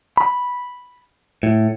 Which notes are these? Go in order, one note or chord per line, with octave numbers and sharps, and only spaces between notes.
B5
A2